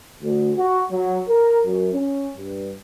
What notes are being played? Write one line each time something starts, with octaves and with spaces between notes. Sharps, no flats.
D2
F#4
F#3
A#4
F#2
C#4
G2